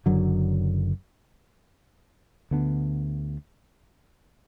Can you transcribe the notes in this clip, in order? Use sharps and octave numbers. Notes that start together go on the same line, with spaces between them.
F#1 F#2 D3 F#3
D2 D3 B3 D4